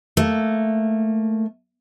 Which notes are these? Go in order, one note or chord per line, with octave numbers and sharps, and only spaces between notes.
A3 A#3